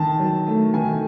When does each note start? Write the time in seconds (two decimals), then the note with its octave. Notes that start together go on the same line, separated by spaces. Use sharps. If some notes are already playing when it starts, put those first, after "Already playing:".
Already playing: D#3 A5
0.19 F#3
0.47 A3
0.74 D#3 G#5